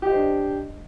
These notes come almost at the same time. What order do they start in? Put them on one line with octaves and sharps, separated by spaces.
G4 D#5 C5 D4